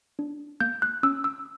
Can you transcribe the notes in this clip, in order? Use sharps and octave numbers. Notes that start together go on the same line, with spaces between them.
D4
A#3 G6
F#6
C#4 E6
E6